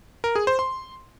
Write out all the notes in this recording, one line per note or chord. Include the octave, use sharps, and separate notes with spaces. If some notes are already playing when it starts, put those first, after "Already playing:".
A#4
G#4
C5
C6